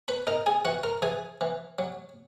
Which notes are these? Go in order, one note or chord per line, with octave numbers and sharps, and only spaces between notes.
B4 B5
D#4 A#4 A#5
G#4 G#5
E3 F#4 F#5
A#4 A#5
E3 G#4 G#5
E3
F#3